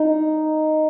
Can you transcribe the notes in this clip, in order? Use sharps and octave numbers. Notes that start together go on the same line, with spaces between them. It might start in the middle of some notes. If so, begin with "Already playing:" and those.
Already playing: D#4